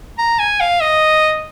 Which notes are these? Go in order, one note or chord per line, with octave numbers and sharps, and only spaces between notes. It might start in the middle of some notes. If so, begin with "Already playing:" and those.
A#5
G#5
F5
D#5